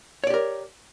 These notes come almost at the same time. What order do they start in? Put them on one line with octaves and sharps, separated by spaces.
C#5 D5 G4 A#4